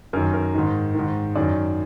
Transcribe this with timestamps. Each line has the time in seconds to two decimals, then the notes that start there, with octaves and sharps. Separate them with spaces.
0.13 F#2 A#4
0.16 D#3
0.34 A#4
0.54 G#2 D#3
0.95 G#2 D#3
1.35 F#2 D#3 D5